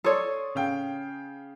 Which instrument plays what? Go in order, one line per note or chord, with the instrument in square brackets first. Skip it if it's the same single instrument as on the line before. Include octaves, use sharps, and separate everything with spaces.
[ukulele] A4 C#5 [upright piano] D5 C6 D#6
[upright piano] C#3 F5 G5